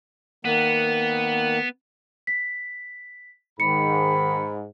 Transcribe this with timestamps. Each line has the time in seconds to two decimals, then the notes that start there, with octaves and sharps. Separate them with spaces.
0.45 D#3 A#3 B3 F#5
2.27 B6
3.60 G#2 D#3 B5 C#7